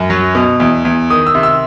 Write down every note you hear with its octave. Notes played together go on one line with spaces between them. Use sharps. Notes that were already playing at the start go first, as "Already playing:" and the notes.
Already playing: F#2
F#3
B2
E2
E2
D#3 D#6
E6
C3
E6